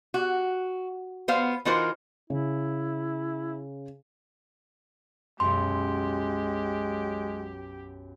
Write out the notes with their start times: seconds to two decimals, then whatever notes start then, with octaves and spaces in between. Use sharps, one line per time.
0.14 F#4
1.28 B3 C5 F5
1.65 E3 D#4 F4 F#4 A#4 C5
2.30 C#3 E4
5.40 B1 F#2 G#3 G4 C6